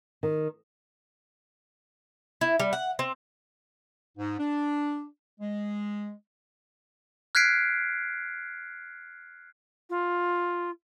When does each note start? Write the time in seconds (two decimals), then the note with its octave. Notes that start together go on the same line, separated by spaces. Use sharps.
0.23 D#3
2.41 E4
2.60 G3
2.73 F#5
2.99 C4
4.18 G#2
4.39 D4
5.40 G#3
7.35 F6 F#6 G#6 B6 C7 D7
9.90 F4